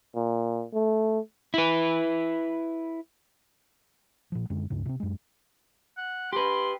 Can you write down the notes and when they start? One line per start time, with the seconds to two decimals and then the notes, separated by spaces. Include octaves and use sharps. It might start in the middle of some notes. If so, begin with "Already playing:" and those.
0.15 A#2
0.74 A3
1.54 E4 B4
4.32 A#2 F3
4.50 F#2 D3 G#3
4.70 C#2 G2 C#3
4.86 C3 C4
5.00 F#2 G#3
5.97 F#5
6.33 G4 B4 C6